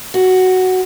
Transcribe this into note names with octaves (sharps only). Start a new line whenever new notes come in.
F#4